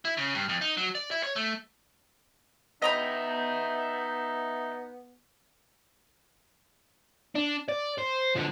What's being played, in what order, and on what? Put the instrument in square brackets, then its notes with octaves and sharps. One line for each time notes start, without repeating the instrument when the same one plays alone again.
[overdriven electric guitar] E4
C#3
G2
F2
D#4
F#3
D5
E4
C#5
A3
[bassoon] B3 [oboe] D#4 [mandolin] D#5 A#5 B5 [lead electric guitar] E5 G5
[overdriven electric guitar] D4
D5
C5
D3 F3